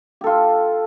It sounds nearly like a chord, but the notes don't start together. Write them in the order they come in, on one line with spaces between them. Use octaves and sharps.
G4 A4 F4